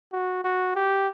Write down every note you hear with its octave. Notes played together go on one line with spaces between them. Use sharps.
F#4
F#4
G4